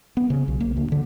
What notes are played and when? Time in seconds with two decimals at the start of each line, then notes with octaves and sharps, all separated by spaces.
0.17 B3
0.30 C#3
0.48 B1
0.60 A#3
0.77 D2
0.92 D3